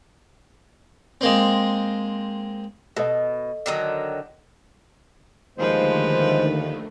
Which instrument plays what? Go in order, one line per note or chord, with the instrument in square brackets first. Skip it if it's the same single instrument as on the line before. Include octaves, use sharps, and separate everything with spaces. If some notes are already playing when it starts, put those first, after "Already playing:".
[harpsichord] G#3 A#3 C4
[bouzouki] B2 [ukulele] A4 D#5
[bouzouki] D3 D#3 F#3
[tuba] D#2 [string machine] D3 D#3 A3 [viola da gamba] F3 B4 [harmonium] G#3 C5